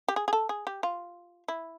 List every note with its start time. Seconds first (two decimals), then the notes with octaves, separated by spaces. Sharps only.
0.08 G4
0.16 G#4
0.28 G#4
0.33 A4
0.49 G#4
0.67 G4
0.83 F4
1.48 E4